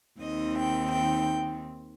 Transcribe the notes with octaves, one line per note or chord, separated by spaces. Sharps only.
D#2 D#3 C4 D#5
G5
G5